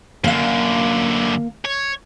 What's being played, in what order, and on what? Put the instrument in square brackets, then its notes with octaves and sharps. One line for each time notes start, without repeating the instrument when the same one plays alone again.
[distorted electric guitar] F#2 D3 [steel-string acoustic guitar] A#3 F5
[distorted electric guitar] C#5